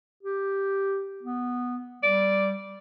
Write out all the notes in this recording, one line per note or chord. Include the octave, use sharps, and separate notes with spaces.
G4
B3
G3 D5